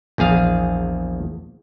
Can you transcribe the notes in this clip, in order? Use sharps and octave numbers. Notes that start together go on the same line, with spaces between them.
A#1 E2 G#4 F5